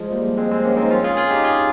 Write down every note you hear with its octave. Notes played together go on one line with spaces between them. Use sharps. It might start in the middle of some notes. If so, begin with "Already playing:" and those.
Already playing: F3 G#3
G3 A#3
G#3 C4
G#3 C4
A#3 C#4
C4 D#4
C#4 F4
F4 G#4
F4 G#4
D#4 G4
F4 G#4